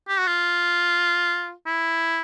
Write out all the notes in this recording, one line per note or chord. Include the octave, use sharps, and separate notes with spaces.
G4
F#4
F4
E4